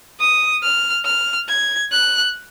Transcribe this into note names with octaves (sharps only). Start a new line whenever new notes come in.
D#6
F6
F6
G#6
F#6